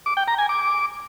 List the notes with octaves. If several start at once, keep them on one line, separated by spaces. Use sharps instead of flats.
D6
G5
A#5
G#5
D6